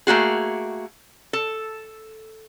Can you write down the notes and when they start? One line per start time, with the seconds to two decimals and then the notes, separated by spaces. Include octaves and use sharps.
0.07 A3 A#3 F#4 G#4
1.33 A4